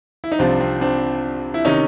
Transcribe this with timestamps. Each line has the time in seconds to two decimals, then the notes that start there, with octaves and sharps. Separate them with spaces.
0.24 E4
0.32 D#4
0.39 C2 C3 F3 C4 D4
0.60 C4
0.81 C4 D4
1.54 E4
1.65 C3 D#3 C#4 D#4